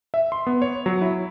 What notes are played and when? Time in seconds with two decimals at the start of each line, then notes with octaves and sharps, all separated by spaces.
0.14 E5
0.32 C6
0.47 B3
0.62 C#5
0.86 F#3
1.02 E4